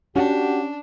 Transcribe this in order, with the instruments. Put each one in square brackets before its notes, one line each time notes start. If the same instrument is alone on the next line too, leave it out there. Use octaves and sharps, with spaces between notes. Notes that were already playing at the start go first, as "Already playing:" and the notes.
[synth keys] C#4 [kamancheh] D4 [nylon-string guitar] F#4 F#5 [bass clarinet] G4